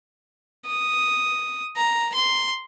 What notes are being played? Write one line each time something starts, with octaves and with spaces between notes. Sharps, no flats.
D#6
A#5
C6